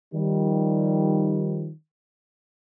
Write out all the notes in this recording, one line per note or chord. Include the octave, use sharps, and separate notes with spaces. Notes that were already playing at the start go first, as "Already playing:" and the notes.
D#3 F3 G3